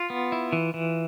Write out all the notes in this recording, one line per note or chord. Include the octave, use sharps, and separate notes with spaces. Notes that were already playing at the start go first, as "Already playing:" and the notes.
Already playing: F4
B3
E4
E3
E3